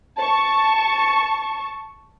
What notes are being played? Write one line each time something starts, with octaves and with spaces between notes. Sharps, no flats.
A5 C#6